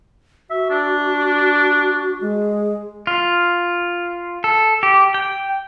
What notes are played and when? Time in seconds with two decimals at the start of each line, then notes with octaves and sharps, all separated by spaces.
0.50 F#4 E5
0.70 D4
2.21 G#3
3.07 F4
4.44 A4
4.83 G4
5.14 G5